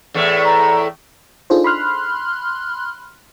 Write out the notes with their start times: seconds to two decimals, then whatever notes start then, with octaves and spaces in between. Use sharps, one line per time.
0.14 E2 A2 A3
0.45 A#5
1.50 D4 D#4 F4 G#4 A4 C5
1.64 B5 C6 F6 F#6